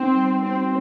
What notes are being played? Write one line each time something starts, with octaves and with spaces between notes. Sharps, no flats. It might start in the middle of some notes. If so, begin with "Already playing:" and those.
Already playing: C4 D#4
G3
C4 F#4